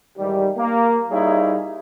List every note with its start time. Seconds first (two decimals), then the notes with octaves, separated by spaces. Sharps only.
0.18 G#2 D#3 E3 G3
0.56 A#3
1.10 G3 D#4 E4 G#4 C#5 F5